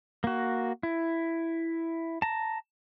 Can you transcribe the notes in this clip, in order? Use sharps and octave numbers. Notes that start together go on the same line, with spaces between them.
A#3 F#4
E4
A5 A#5